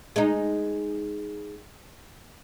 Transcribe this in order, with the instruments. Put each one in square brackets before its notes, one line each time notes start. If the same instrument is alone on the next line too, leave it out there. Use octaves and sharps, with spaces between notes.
[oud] G#3 D#4